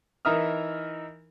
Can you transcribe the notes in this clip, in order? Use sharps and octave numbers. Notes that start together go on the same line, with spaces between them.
E3 D#4 A#4 E5 D#6 F6